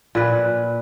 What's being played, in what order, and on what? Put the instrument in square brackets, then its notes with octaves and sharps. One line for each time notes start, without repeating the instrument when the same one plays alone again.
[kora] A#2 B4